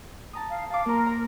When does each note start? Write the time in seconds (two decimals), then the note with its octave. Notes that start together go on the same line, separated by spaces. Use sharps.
0.33 A5 A#5 D#6
0.49 F5
0.70 F5 A5 D6
0.86 A#3 A#4 C5
1.06 A#5